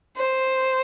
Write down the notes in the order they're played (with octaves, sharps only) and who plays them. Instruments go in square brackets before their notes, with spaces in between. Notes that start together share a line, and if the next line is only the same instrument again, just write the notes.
[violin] C5